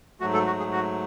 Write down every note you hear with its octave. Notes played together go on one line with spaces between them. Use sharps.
G#2 F#3 A3 F#4
A4
F#4
G#4
F#4